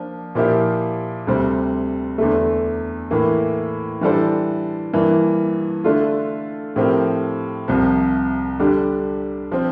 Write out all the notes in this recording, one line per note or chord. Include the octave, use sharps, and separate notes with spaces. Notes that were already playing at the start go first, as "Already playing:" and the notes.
Already playing: F3 A#3 D4
A#2 F3 A#3 E4 G4
D2 C3 G3 C4
E2 D3 A3
A2 E3 A#3
E3 G3 D4 A4 C5
G2 E3 A#3
D3 A3 D4 F4
A2 F3 C4 G4 A#4
C2 C3 F3
D3 G3 D4 G4
F3 C4